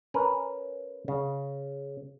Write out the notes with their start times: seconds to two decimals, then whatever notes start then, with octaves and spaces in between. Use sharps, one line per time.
0.14 C#4 A#4 B4
1.08 C#3